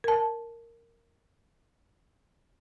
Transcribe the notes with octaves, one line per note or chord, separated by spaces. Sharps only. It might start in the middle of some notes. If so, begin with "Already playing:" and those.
A#4 A5